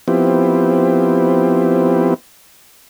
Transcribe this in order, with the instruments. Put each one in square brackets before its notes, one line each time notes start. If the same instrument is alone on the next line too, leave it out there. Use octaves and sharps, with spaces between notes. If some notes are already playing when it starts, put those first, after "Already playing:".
[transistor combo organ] F3 B3 C4 E4 G4